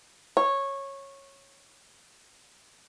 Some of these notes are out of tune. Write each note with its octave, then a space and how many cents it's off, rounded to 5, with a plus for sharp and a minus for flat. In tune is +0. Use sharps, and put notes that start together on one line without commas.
C#5 -15